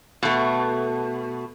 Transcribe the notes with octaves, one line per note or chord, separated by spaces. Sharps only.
B2 A3